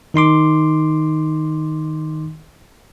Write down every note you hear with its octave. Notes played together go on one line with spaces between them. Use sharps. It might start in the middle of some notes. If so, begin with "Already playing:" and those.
D#3 D#4 C6 D6